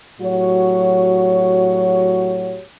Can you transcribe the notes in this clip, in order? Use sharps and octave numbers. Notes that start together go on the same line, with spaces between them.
A2 F#3 F#4 G4 C#5